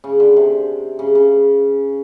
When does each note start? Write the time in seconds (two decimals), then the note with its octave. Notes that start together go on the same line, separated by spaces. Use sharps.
0.04 C#3
0.20 D3
0.37 C3
0.99 C#3
1.15 C#3